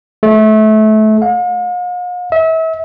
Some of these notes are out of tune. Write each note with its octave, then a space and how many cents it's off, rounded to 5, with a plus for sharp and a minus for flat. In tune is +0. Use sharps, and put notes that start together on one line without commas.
A3 -25
F5 +45
E5 -35